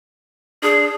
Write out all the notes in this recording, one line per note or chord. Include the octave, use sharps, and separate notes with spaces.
D4 G#4